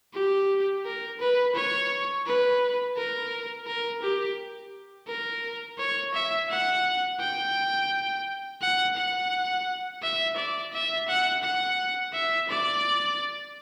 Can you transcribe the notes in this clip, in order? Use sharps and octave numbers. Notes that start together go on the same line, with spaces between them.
G4
A#4
B4
C#5
B4
A#4
A#4
G4
A#4
C#5
E5
F#5
G5
F#5
F#5
E5
D5
E5
F#5
F#5
E5
D5